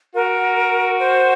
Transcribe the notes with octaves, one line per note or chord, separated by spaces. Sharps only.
F#4 A#4
C5